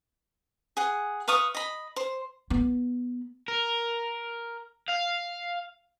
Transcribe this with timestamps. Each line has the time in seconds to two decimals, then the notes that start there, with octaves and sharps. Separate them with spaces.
0.77 G#4 F#5
1.28 B4 F5 C#6 D#6
1.55 D#5 B5
1.96 C5
2.50 B3
3.48 A#4
4.88 F5